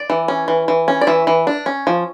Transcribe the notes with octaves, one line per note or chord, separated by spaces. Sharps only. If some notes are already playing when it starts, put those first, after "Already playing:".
Already playing: D5
E3
C#4
E3
E3
C#4
D5
E3 E5
E3
D4
C#4
F3